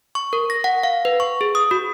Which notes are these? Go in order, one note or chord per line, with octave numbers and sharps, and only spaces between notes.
C#6
A#4
A#6
F#5
F5
B4
C#6
G#4
D#6
F#4